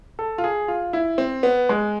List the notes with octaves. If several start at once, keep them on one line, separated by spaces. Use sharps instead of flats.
A4
F4
G#4
F4
E4
C4
B3
G#3